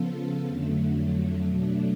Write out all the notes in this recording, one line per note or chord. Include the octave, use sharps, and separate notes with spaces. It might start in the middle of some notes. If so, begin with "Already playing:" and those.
Already playing: C#3 F3 B3 F4 A4
F2 D3 F#3 A3
B2 F#3 A3 D4